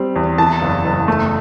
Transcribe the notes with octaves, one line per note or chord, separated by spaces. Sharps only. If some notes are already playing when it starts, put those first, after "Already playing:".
Already playing: G3 C4
E2
E3 A5
F#1
F#1
A3